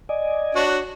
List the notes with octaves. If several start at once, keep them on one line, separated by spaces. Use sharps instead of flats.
D5 D#5 G#5
D4 F#4 C#5